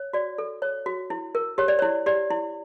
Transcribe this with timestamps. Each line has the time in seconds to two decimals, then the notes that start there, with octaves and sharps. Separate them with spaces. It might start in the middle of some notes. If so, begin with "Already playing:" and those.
Already playing: C#5
0.13 F#4 D5
0.38 A4
0.62 C#5
0.86 F#4
1.10 E4
1.35 A#4
1.58 G4 C#5
1.68 D5
1.79 E4 C#5
2.06 G4 D5
2.31 E4